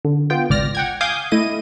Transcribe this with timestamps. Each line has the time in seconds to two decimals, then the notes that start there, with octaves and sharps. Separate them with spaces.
0.05 D3
0.30 B3 F4 G5
0.50 G#1 C#2 D5 F6 A#6
0.75 F#5 G5 G#6
1.01 F5 G#5 D6 D#6 G6 G#6
1.32 A3 E4 D#5 D#7